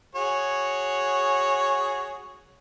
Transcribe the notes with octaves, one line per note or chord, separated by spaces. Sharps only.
F#4 G#4 C#5